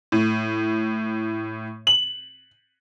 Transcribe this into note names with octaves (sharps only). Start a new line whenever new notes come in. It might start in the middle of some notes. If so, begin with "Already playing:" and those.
A2
F#7